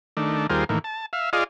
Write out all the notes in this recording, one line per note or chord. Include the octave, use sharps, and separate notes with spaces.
D#3 A3 D4
D#2 G3 F4 G#4 A#4 C5
A2 D#3 E3 A#3
A5
E5 F5
F4 G#4 D5 D#5 F5